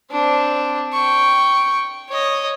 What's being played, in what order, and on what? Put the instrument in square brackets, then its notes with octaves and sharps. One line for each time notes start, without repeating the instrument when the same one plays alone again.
[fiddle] C4 D4
G5 C#6
C#5 D#5